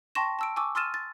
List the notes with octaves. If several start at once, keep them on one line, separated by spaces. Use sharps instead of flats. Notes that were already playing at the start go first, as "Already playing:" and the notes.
G5 A5 C6 C#6 A#6 E7
A5 E6 D7
G#5 C#6 D6 E6
C6 E6 F6 A6 D#7 E7
A6